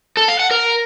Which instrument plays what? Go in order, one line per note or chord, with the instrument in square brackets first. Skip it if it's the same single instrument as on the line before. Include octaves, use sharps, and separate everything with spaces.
[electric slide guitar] A4
F5
F#5
A#4